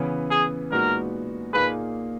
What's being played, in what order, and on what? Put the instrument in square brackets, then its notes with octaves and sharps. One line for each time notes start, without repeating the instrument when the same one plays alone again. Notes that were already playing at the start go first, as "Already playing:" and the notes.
Already playing: [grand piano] C#3 E3 B3
[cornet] G#4
[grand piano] A#2 G#3 B3 D#4 F#4 [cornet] A#4
[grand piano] A#2 A#3 D#4 G#4 [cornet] B4